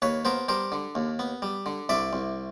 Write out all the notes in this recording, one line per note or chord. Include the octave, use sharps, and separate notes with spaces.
D#2 B4 C#5
B3 A#4 C5
G3 A#4 C5
D3
D#2
B3
G3
D3
C2 D5 E5
C2